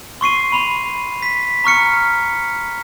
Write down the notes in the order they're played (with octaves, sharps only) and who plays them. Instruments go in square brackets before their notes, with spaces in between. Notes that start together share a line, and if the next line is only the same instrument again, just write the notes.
[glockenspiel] C6 C#6 C7 D#7
B5 C6 F7
B6
A#5 C#6 F6 C#7